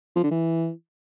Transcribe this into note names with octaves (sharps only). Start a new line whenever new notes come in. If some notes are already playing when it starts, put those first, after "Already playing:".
F3
D3
E3